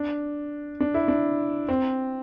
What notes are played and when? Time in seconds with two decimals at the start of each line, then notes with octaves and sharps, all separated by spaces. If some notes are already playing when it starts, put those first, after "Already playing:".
Already playing: D4
0.80 D4
0.94 E4
1.08 D4
1.69 C4